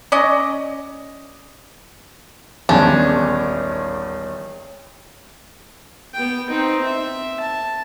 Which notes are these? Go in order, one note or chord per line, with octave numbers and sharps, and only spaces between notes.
C#4 D5 D#5
D#1 G#1 E2 C#4 D4
B3 G5
C4 D#4
E5
A5